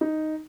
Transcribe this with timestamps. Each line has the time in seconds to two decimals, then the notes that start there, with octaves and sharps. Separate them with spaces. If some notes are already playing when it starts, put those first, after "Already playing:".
0.01 D#4